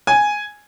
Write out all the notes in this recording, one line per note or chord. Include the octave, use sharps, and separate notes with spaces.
G#5